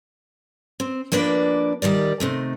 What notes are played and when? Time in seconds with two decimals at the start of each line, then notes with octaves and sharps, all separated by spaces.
0.80 C4
1.12 F3 A#3 D4 B4 D5
1.82 D#3 G3 A#4 D5
2.20 C3 D#3 A3